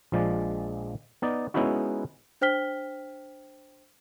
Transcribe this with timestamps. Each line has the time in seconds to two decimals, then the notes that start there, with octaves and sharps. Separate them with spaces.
0.12 A#1 F3 G#3 D5
1.22 B3 D#4 D5
1.54 G#3 B3 C#4 D#4 E4 F#4
2.41 D4 C5 G5 F6 B6 G7